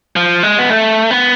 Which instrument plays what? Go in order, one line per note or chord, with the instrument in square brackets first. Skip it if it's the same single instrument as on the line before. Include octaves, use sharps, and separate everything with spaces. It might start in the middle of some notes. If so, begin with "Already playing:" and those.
[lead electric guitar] F3
G#3
B3
A3
B3